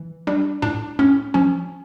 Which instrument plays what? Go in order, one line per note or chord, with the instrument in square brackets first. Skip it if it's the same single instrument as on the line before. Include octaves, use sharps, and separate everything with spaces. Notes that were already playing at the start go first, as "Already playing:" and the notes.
Already playing: [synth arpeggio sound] E3
G3 D4
A2 D4
A2 C#4
F3 C#4